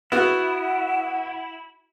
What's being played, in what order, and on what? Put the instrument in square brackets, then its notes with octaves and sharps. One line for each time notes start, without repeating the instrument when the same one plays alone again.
[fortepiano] B3 F#4 [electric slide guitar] E4 [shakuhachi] F#5